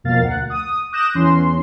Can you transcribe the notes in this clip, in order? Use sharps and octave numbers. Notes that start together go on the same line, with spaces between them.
F2 B2 A#3 F5 A6
D2 F#5
D#6
D6 D#6 F#6 G6 A#6 E7
E2 C#4 C6